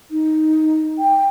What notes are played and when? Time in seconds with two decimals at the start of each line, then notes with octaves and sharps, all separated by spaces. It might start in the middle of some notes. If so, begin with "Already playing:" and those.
0.11 D#4
0.99 G5